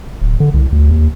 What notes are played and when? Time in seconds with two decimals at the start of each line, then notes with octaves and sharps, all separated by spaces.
0.21 D1
0.40 D3
0.54 C2
0.72 D2
0.91 D#2